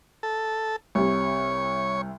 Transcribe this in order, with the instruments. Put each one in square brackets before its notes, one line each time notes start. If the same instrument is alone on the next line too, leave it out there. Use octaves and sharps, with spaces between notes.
[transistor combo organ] A4
[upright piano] C2 C3 [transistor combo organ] C#5